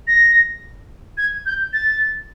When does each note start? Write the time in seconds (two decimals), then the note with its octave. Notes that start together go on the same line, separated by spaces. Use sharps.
0.07 A#6
1.18 G#6
1.46 G6
1.73 A6